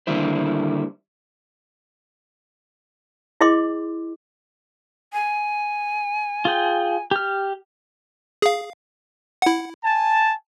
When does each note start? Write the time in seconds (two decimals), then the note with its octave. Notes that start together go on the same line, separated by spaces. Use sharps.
0.07 D3 D#3 G3 A#3 E4 C5
3.41 E4 G#4 D#5 C6 D6
5.13 G#5
6.45 F4 G#4 G5
7.11 G4 F6
8.42 G#4 F5
9.42 E4 F#5
9.84 G#5 A5